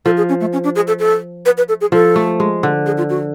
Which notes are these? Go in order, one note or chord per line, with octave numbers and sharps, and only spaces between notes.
F3 A4
G#4
C#4
A3
C#4
D4
G#4
A4
A4
B4
B4
A4
G#4
F3 A4
A3
G#3
D3
G#4
F4
F#4